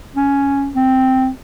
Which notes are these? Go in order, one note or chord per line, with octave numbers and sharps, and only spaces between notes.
C#4
C4